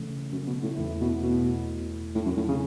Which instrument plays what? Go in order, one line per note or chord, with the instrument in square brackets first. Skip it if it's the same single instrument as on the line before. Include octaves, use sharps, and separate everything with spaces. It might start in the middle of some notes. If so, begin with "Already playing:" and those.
Already playing: [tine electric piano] C#3 E3 A3 C#4
[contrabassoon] F#2
B2
A2
[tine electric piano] E2 E3 A3 E4 [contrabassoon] A2
[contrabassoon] B2
B2
A2
F#2
A2
C#3